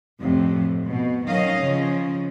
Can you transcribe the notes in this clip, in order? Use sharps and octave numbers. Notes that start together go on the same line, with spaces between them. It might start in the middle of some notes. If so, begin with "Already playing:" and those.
F2 A2 C3
B2
D#3 F#3 C#4 D#5 F5
C#3 F3